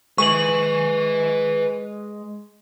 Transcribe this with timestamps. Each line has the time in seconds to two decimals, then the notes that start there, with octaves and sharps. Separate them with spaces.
0.18 G#3 B4 G#5 C#6 F#7